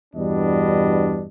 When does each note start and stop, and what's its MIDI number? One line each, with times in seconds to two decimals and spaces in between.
0.15 1.25 40
0.15 1.25 43
0.15 1.25 47
0.15 1.25 55
0.15 1.25 62
0.15 1.25 75